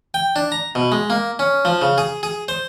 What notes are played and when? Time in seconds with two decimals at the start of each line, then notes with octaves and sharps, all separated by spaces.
0.14 G5
0.36 D4
0.52 A#5
0.75 B2
0.92 G#3
1.10 A#3
1.39 C#4
1.65 F3
1.82 C#3
1.98 G#4
2.23 G#4
2.48 C5